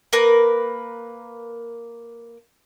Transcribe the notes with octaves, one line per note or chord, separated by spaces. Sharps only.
A#3 A#4 B4